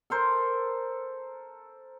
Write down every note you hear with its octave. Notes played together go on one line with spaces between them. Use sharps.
A4 A#4 C5